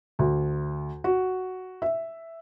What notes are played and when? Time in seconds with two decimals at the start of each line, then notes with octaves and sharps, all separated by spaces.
0.19 D2
1.04 F#4
1.82 E5